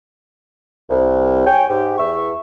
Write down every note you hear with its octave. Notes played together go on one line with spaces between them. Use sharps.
C2
C#5 G5 G#5
G#2 G4
E2 E5 C#6